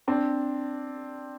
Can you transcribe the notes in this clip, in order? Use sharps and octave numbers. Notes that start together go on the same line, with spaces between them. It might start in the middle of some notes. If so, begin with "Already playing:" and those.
C4 D4